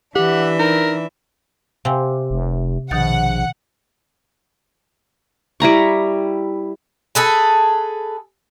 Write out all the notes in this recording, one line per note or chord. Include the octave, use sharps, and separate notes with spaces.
E3 D4 G4 E5 F#5
D#4 A#4
C3 F5 G5 G#5
F1
A#1 B2 D#3 F#5 A6
G3 E4 A#5 C#6
G#4 A4 B4